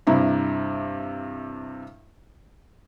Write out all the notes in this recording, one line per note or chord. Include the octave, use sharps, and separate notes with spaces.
G2 C3 E4 A#5